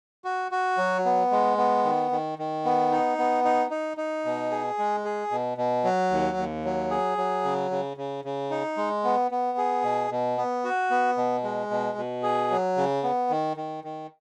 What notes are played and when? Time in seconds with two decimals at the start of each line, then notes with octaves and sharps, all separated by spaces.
0.25 F#4
0.52 F#4
0.78 F#3
1.05 B3
1.31 G#3
1.58 B3
1.84 D#3
2.11 D#3
2.39 D#3
2.65 B3
2.92 D#4
3.19 B3
3.45 D#4
3.71 D#4
3.97 D#4
4.25 B2
4.51 G#4
4.78 G#3
5.05 G#4
5.31 B2
5.58 B2
5.84 F#3
6.10 D#2
6.37 D#2
6.65 F#3
6.91 G#4
7.18 F#3
7.45 C#3
7.71 C#3
7.97 C#3
8.25 C#3
8.50 D#4
8.77 G#3
9.04 B3
9.31 B3
9.58 G#4
9.83 B2
10.11 B2
10.38 B3
10.64 F#4
10.90 B3
11.17 B2
11.44 G#3
11.70 B2
11.98 B2
12.23 G#4
12.51 F#3
12.77 C#3
13.03 B3
13.30 D#3
13.57 D#3
13.84 D#3